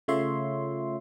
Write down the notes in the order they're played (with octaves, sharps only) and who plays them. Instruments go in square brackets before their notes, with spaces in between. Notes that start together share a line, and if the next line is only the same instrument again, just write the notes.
[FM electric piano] C#3 A3 F4 C#5 E5 C6